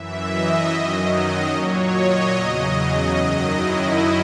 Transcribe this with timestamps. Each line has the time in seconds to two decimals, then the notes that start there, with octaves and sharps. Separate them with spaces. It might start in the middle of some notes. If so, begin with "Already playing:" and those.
Already playing: F#2 E3 E5
0.30 D#5
0.71 F#2 D#3 F#3
1.52 A#2 F#3 C#5
1.94 D#5
2.34 E2 C#3 F#3
3.16 F#2 D#3 F#3
3.56 E4